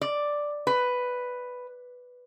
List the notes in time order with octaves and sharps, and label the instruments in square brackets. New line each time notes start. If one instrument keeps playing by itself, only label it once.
[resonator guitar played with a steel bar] D5
B4